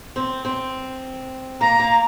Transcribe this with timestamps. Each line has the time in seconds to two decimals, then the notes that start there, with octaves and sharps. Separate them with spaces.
0.16 C4
0.45 C4
1.60 A#3 A#5
1.80 A#3